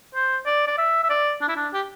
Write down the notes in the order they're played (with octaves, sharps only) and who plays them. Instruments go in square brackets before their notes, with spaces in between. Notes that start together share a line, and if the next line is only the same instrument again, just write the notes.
[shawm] C5
D5
D5
E5
E5
D5
D4
E4
D4
G4